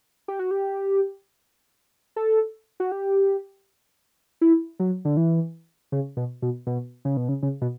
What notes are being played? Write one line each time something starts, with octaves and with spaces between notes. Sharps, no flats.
G4
F#4
G4
A4
F#4
G4
E4
F#3
D3
E3
C#3
B2
B2
B2
C#3
B2
C#3
C#3
B2